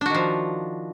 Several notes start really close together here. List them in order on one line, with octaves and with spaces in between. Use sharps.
D4 F#4 D#3 F3